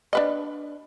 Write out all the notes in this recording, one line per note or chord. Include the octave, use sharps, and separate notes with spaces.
D4 B4 D#5